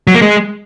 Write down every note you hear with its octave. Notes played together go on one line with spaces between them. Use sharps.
F#3
A#3
G#3